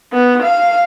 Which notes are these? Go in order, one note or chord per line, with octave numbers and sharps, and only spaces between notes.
B3
F5